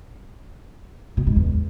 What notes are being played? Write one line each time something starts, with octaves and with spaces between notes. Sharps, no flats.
B2
G#2
E2